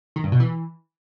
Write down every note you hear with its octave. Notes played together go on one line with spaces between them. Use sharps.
D#3
G2
B2
E3